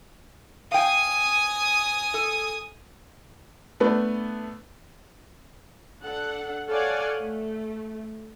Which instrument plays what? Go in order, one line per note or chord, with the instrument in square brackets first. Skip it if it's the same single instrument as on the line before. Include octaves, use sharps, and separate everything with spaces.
[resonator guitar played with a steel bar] F5 G5 [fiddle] G#5 D#6
[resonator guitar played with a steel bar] A4
[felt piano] A3 B3 D4 B4
[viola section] D4 A4 F#5
A4 C#5 D5 F5 F#5 G#5
A3